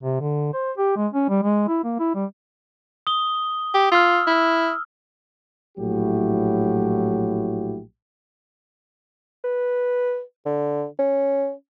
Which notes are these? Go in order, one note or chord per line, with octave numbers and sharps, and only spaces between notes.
C3
D3
C5
G4
G#3
C#4
G3
G#3
E4
A#3
E4
G3
D#6 G7
G4
F4 E6 F6
E4
A#1 A2 F#3 E4 F#4 G4
B4
D3
C#4